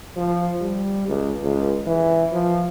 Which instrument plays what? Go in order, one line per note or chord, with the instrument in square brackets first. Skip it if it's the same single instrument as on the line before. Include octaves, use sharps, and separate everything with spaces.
[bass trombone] F3
G3
C#2
C#2
E3
F3